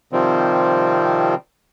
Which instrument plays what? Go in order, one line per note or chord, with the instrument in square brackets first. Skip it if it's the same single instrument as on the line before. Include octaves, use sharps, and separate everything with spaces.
[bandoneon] C3 D#3 F3 G3 C4